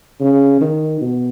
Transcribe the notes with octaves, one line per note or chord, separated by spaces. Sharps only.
C#3
D#3
B2